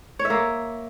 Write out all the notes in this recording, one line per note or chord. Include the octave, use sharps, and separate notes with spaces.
C#5
E5
A#3